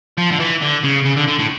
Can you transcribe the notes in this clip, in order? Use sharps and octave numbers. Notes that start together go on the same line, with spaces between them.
F3
D3
E3
D3
C#3
C#3
D3
D3
A2